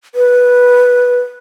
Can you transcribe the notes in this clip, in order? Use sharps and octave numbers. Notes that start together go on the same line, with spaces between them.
B4